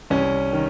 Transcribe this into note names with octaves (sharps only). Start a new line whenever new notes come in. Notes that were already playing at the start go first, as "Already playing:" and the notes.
C2 C#4
D#3